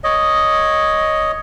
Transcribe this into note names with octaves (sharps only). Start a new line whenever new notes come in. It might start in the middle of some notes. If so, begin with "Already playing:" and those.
C#5 D#5